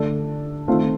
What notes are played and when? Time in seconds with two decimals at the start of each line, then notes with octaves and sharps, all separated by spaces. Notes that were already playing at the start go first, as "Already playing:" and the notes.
Already playing: D3 A3 D4 A4
0.68 D#3 A3 C4 F4